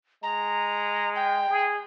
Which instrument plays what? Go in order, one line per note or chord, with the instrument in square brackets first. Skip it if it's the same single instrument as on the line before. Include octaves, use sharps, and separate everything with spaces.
[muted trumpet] G#3 [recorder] A#5
[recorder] G5
[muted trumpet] G#4